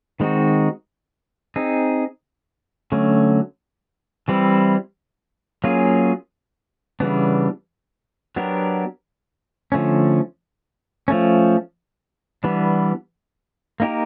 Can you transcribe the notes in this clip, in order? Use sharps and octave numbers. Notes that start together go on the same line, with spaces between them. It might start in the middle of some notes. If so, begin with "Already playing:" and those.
D#3 G#3 C4 D#4 F#4
C4 D#4 G#4
D3 F#3 A3 C#4
E3 G3 C4 E4
F#3 A#3 C#4 F4 G#4
C#3 E3 G3 B3 D4
F#3 B3 D4 G4 A#4
D3 F3 A3 C#4
F3 A3 C#4
E3 G3 B3 D4
A#3 D#4 G4 A#4